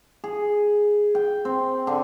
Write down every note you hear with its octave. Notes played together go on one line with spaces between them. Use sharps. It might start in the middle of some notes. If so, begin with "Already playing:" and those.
G#4
G5
C4
D3